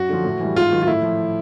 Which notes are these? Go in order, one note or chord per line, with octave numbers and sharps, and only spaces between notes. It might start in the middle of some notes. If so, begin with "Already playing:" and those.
Already playing: F#2 F#4
D3 F3
A2
E3 G3
G#2 F4
D#3 F#3
F4
A2 E4
F3